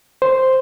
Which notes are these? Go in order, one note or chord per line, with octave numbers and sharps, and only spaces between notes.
C5